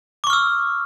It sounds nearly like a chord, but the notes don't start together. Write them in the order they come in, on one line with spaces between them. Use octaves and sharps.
D6 C#6 F6 E6